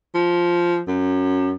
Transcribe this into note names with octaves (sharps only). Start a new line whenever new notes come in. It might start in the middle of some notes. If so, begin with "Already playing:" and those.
F3
F#2